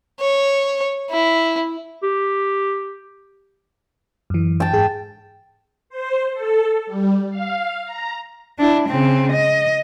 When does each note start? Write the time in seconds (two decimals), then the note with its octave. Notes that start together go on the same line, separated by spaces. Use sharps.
0.21 C#5
1.11 E4
2.03 G4
4.30 F#2 E3
4.60 G5 A5
4.73 G#2 G#4
5.89 C5
6.34 A4
6.87 G3
7.30 F5
7.85 A#5
8.59 D4 E4
8.89 C#3 C4
9.32 D#5